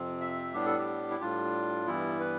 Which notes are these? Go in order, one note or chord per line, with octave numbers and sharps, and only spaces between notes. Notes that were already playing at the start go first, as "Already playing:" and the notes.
Already playing: F2 C3 F3 C4
E5
A2 G3 B3 D4 G4
A4
G4
E4
A2 G3 D4 F4
G2 E3 G3 B3 E4
B4